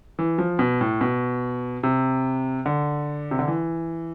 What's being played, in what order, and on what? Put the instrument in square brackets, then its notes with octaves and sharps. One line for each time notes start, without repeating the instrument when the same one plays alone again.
[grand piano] E3
F3
B2
A2
B2
C3
D3
C3
D3
E3